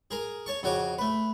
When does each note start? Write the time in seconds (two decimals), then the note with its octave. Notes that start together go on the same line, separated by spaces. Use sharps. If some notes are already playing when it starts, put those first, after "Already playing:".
0.11 G#4 A#4 A#5
0.46 C#5 A5 C#6
0.63 F2 C#3 F#4 C#5 D6
0.98 A3 B4